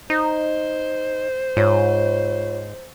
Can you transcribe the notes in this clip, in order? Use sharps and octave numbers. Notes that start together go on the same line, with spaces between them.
D#4 C5
G#2 F4 C#5